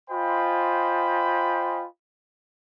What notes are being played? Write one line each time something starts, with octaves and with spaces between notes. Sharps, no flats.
F4 C5 D#5 G5 G#5 B5